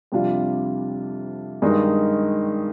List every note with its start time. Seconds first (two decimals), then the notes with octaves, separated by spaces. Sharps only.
0.12 F2 C3 G3 D4 F4
1.62 G2 D#3 G#3 D#4